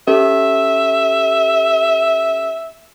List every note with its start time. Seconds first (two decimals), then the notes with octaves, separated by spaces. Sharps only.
0.08 C#4 G4 A4 E5